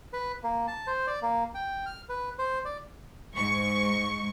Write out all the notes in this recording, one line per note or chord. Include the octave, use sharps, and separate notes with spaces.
B4
A#3
A5
C5
D5
A#3
G5
F6
B4
C5
D5
G#2 C#6